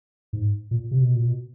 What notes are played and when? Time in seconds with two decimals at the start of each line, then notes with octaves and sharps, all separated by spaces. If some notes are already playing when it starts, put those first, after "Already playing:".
0.33 G#2
0.71 A#2
0.91 C3
1.02 B2
1.15 A#2
1.26 B2